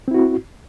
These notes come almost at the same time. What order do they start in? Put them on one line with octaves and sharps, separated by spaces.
C4 E4 F#4